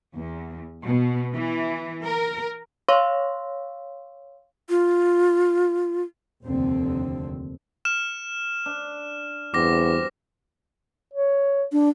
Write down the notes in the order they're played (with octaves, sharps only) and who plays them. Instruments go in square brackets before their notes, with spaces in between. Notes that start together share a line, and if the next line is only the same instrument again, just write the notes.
[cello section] E2
B2
E3
A#4
[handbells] C#5 F5 C6 C#6 E6 A#6
[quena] F4
[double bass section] F1 D#2 D3 C4
[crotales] F6 E7
[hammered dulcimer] D4
[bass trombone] E2 [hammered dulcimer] G2 C4 F#4 [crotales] D6 A#6
[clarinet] C#5
[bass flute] D4